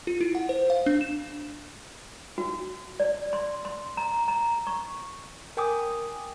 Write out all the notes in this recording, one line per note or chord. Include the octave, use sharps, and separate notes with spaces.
F4
E4
F#5
C5
F5
D4
E7
F#4
D5
C6
C6
A#5
A#5
C#6
A#4 G5 G#5 D6 D#6